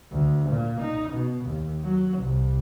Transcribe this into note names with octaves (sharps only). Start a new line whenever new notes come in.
D2
A#2
D#4
B2
D#2
F#3
C2